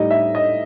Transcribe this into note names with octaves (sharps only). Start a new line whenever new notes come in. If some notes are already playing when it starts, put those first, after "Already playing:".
Already playing: A2 G3 D#4 D#5
E5
D#5